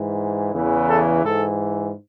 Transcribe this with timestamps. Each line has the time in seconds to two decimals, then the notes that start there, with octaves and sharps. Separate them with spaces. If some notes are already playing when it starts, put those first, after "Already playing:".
Already playing: G#2 E3
0.53 E2 C#3 E3
0.89 A4
1.23 G#2 E3 A4